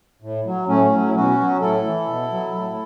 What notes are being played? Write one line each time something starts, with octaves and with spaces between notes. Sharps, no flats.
A2
F#3
A2 A3 C#4
F#3
E4
B2 C#4 F#4
F#3
A2 E4 A4
E3
B2
F#3
A2